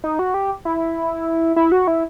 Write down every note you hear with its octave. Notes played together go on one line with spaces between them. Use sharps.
D#4
F#4
G4
E4
E4
F#4
E4